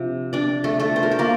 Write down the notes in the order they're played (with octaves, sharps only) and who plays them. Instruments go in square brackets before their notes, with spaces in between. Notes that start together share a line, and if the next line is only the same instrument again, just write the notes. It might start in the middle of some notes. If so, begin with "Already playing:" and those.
Already playing: [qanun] C3 F3 D4
D4 D5
A3 A4
A3 A4
C5
A#4
A4
A#3 A#4